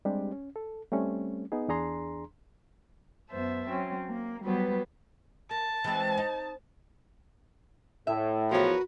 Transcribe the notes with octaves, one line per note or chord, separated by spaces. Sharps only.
G3 G#3 C4 D4 G4
C#4
A4
G3 A3 C4 C#4
B3 D#4 G#4
E2 D4 G#4 A#5 C6
F#2 B3 C5 E5 A5
F#3 C4 C#4
A#3
F#3 G3 B3 B4 C5
A#4 A5
E3 G#3 C4
D#4
A2 E5
E2 F3 F#4 A#4 B4 C#5